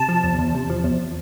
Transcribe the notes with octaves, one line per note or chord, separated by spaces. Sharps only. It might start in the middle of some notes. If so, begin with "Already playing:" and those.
Already playing: C3 A5
F3
E2
E2
C3
F3
E2